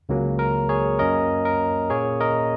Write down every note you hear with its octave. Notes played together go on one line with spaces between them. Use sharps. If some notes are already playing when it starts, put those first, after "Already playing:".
C#2 C#3 F#3 A#3 C#4
A#4
G#4 C#5
F#2 F#3 A#3 C#4 A#4 D#5
A#4
A#2 A#3 C#4 G#4 C#5
A#4 D#5